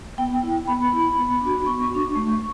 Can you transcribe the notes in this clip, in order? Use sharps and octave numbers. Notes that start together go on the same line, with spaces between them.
B3 G5
E4
B3 B5
E4
B3
D4 F#4
B3 C#6
D4 F#4
A3